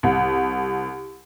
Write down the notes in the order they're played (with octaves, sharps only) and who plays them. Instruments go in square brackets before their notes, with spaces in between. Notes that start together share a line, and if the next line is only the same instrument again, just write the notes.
[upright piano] C2